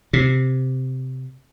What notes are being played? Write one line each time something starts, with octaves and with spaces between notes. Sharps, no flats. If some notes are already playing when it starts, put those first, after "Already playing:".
C3